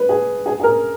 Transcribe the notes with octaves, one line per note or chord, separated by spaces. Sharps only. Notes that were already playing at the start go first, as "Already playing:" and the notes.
Already playing: B4
G#4
G#4
G#4
A#4